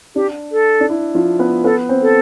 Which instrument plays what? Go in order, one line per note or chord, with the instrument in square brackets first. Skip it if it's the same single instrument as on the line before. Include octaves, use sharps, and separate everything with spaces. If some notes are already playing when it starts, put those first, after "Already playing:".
[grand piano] D4 [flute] G4
[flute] A4
[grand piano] D4
E4
F3 F4
B3 B4
[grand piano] B3 B4 [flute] A4
[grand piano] C4 C5
[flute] A4